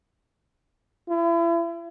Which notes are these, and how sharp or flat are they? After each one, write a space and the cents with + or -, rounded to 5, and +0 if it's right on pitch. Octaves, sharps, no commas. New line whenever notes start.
E4 +40